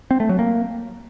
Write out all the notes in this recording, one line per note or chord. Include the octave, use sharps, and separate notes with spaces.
C4
A3
F#3
A#3